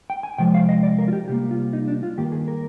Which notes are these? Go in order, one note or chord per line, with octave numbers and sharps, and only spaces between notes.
G5
G#5
C3 F3 G#3 G5
F5
D#5
D5
A#4
F4
G4
C3 G3 A#3 G4
F4
D#4
D4
F4
G2 D#3 A#3 G4
G#4
A#4